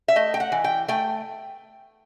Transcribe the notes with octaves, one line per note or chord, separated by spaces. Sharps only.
E5
A3 D#5
G5
F#5
E3
G5
A3 G5